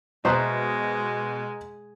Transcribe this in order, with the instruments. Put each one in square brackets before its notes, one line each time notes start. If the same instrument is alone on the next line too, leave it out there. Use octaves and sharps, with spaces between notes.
[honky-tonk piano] B2 [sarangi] G#3 [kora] C5 E5 [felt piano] D#5 A#5 F#6